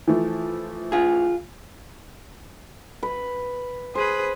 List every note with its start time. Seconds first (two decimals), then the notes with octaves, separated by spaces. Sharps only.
0.08 E3 F3 A3
0.92 F4 G#4
3.03 B4
3.95 G#4 B4 C5